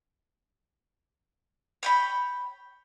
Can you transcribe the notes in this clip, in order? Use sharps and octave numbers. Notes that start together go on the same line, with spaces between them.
C#5 G5 B5